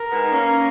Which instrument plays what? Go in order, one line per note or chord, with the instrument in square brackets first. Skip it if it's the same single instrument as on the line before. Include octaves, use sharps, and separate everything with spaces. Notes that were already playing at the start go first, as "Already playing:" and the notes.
Already playing: [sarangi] A#4
[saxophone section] G#3 B3
D#4
A#3 C#4